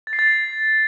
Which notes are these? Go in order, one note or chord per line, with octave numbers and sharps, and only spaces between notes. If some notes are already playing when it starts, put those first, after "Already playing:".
A6
C7
A6